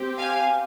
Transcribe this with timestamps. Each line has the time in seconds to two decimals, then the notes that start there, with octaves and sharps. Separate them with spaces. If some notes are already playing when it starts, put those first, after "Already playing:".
Already playing: C4 G4
0.18 F5 G#5